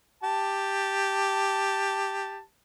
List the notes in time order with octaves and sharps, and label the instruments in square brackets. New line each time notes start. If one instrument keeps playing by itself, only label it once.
[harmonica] G4 A5